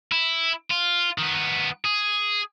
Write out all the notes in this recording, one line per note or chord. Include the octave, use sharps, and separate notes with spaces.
E4
F4
D#3 B3
G#4